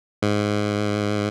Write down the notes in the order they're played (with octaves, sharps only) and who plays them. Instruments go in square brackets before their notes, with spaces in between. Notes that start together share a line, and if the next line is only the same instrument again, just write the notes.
[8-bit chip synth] G#2